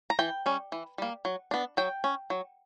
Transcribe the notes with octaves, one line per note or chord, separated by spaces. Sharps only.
A#5
E3 G5
G3 C#4
E3
G3 A#3
F#3
B3 D4
F#3 G5
C#4
F#3